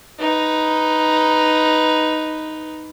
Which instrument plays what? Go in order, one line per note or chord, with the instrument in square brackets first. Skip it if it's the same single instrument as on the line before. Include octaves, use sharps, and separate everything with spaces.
[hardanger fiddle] D#4 B4